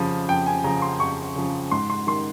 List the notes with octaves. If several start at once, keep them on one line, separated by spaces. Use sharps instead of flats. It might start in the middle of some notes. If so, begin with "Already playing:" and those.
Already playing: F2 C#3 F3
F2 G5
G#5
C#3 F3 A#5
C6
F2 C#6
C#3 F3
G#2 C6
C6
D#3 C6